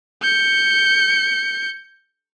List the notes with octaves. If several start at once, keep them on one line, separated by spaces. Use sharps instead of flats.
G6 C#7